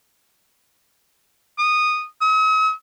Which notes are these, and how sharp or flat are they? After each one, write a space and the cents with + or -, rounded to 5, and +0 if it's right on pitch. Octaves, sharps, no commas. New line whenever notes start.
D#6 -10
D#6 +45